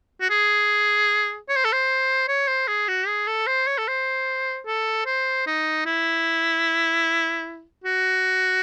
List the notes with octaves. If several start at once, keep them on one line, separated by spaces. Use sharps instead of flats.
F#4
G#4
C#5
C5
A4
C5
C#5
C5
G#4
F#4
G#4
A4
C5
C#5
A4
C5
A4
C5
D#4
E4
F#4